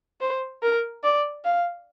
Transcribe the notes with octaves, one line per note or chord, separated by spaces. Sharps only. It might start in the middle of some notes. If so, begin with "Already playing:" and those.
C5
A#4
D5
F5